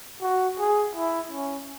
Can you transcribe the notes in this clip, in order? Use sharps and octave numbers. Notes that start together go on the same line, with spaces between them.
F#4
G#4
E4
C#4